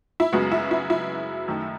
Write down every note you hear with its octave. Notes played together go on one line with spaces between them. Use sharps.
E4
F#2 C#3 G#3 B3 F#4
E4
E4
E4
F#2 D#3 A3